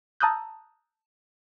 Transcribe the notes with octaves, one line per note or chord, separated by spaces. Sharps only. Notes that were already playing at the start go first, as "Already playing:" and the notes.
A5 A#5 D#6 E6 F#6 G6